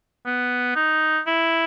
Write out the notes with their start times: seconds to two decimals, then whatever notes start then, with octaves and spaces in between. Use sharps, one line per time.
0.26 B3
0.76 D#4
1.27 E4